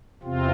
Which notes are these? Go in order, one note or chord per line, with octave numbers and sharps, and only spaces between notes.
E2 C3 C4 F4